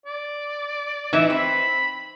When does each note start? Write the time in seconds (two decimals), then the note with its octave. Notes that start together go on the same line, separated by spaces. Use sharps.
0.06 D5
1.13 E3 D#4 E5
1.30 C4 B5